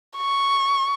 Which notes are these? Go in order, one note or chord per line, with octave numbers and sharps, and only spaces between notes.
C#6